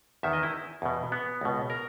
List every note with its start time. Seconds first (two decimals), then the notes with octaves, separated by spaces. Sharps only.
0.23 E2 D#3 E5
0.33 D#5
0.43 E4
0.82 E2 B2
1.12 B3
1.41 C#2 B2
1.70 A#4